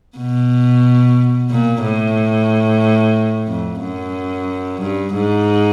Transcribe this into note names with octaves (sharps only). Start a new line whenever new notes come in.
B2
A#2
A2
F2
F#2
G2
G#2